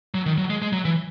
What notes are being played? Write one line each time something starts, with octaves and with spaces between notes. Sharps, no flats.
F#3
D#3
F#3
G#3
G#3
F#3
E3